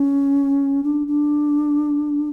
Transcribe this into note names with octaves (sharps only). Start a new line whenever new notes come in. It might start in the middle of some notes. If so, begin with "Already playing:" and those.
Already playing: C#4
D4
D4